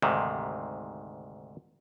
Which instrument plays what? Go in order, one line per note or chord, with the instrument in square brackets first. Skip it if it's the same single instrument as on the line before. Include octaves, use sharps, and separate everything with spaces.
[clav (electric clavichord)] D2 G#2 C3 D#3